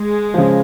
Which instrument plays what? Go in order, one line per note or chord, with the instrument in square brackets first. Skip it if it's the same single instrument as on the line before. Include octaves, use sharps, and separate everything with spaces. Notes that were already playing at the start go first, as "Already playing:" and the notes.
Already playing: [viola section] G#3
[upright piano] C#3 F3